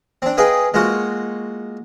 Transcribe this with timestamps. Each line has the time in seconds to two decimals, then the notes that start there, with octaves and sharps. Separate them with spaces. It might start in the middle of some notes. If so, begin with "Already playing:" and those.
0.22 C4 D4
0.37 G#4 B4 D#5 F5 G5
0.74 G#3 A#3 F4 F#4